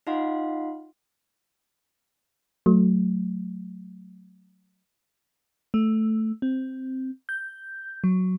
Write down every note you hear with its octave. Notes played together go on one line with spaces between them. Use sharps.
D#4 F4 D#5 F5 F#5 C6
F#3 A3
A3
C4
G6
F#3